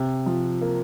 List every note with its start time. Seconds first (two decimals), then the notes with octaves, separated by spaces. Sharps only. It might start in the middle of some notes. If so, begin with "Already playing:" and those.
Already playing: C3
0.26 F3
0.61 A#3